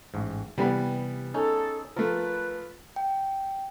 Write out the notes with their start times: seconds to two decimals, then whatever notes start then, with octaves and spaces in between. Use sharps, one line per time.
0.14 A1 G#2
0.58 C3 E3 G3 B3
1.34 C#4 D#4 G#4 A4
1.96 F3 A3 A#4 B4
2.96 G5